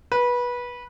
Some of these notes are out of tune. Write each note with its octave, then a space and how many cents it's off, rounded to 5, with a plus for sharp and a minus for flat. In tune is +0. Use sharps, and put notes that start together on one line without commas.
B4 -20